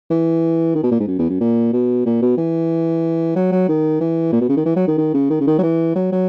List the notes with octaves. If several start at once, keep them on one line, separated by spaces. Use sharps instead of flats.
E3
D#3
B2
A#2
G#2
F#2
E2
F#2
A#2
B2
A#2
B2
E3
F#3
F#3
D#3
E3
A#2
B2
C#3
D#3
E3
F#3
D#3
D#3
C#3
D#3
C#3
D#3
F#3
E3
F#3
F#3